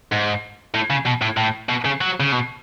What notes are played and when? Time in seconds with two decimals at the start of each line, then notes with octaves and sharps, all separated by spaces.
0.12 G#2
0.74 A2
0.90 C#3
1.06 B2
1.22 A2
1.37 A2
1.69 B2
1.85 C#3
2.01 F#3
2.20 C#3
2.32 B2